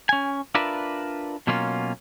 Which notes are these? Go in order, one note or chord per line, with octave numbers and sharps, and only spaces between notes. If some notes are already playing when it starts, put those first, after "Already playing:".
C#4 G#5
D4 F4 A#4 B4 D5 E5
B2 F#3 A#3 C#4 F4